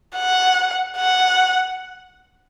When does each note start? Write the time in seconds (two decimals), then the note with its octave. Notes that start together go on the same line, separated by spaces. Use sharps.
0.16 F#5
0.98 F#5